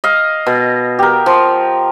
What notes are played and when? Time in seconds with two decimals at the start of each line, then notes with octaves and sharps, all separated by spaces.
0.04 D#5 F5
0.47 B2
0.99 G4 A#4
1.26 F3